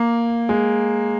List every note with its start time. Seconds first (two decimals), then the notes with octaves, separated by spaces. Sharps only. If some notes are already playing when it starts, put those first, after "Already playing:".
Already playing: A#3
0.49 G#3